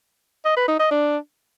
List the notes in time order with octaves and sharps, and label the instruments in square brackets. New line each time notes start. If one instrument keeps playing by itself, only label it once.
[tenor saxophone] D#5
B4
D#4
D#5
D4